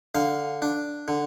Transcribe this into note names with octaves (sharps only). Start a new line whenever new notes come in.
D3 F5
D4
D3